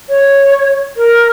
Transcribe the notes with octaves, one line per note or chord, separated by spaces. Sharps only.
C#5
A#4